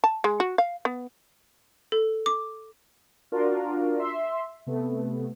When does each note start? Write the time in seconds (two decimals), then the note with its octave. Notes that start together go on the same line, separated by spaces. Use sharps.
0.04 A5
0.24 G#3
0.40 F#4
0.58 F5
0.85 B3
1.92 A4
2.26 D6
3.32 D4 F4 F#4 A#4
3.99 E5 C6
4.67 C3 A3 B3